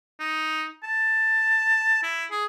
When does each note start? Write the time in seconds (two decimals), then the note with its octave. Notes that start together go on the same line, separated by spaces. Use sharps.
0.20 D#4
0.83 A5
2.03 E4
2.31 G#4